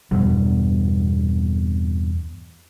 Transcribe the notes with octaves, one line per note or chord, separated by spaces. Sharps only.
E2 G2 B2 F#3